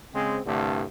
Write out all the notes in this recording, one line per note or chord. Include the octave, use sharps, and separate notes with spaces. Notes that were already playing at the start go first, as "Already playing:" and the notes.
C#3 G#3 C4
C2 G2 D3 A3